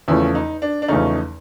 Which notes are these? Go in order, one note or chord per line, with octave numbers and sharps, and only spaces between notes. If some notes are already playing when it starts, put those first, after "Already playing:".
E2 C#3 F3 A3 C#4 E4
D#4
D4
D4
E2 C#3 F3 A3 C#4 D#4